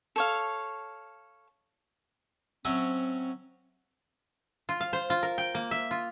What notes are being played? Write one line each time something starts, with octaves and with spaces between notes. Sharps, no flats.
A4 C#5 F5
F#3 C4 C#4 E5
F4
F5
C5
F4
A#4
G5
A#3
E5
F4